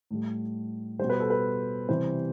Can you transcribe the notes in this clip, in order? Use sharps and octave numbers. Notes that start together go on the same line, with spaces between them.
A2 G3
B2 G3 C5
B4
A4
B4
C3 E3 G3 C5